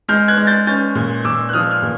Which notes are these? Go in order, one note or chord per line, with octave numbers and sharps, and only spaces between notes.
G#3 F6 G6
F#6 G#6
G#3
G6 A6
C#4 G6 A6
A#2
A#2 D6 E6
F#6
F3 D#6 F6
F6
A#2